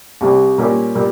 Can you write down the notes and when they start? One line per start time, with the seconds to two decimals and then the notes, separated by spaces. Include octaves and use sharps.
0.21 C2 C3 G3
0.58 A#2 G3 A#3 C#4
0.95 A#2 G3